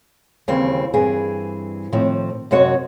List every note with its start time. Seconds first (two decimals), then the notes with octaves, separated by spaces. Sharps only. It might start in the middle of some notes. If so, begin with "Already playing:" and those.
0.48 D#2 C#3 E3 G3 C4
0.94 G2 E3 C4 G#4
1.93 A2 D#3 F3 C4
2.51 F#2 C3 C4 F#4 C#5 D#5